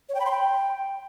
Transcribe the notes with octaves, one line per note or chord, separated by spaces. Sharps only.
C#5
G5
B5
C6
G5